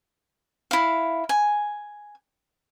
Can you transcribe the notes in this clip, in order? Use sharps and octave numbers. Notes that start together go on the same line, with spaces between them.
E4 F5
G#5